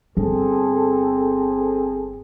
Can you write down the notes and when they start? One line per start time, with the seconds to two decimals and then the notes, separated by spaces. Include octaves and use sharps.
0.17 G1 C4 G#4 A4